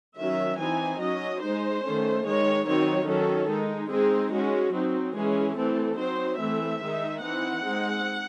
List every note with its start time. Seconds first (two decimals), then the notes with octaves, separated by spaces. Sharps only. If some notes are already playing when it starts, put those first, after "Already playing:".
0.16 D#3 F#3 C#4 E5
0.58 E3 C4 D#4 G#5
0.99 F#3 C#4 D#5
1.41 G#3 D#4 C5
1.83 D#3 A3 C#4
2.24 D#3 G#3 D#4 C#5
2.65 D#3 F#3 C4 D#4 C#5
3.07 D#3 F#3 C#4 A4
3.48 G#3 D#4
3.90 G#3 C4 D#4 G#4
4.31 G#3 C#4 F#4
4.73 F#3 C4 D#4
5.15 E3 G#3 C#4 G#4
5.56 E3 A3 C4 A4
5.97 F#3 C4 D#4 C5
6.39 E3 A3 C4 E5
6.81 D#3 G#3 D#4
7.22 E3 C4 D#4 F#5
7.64 G#3 C4 D#4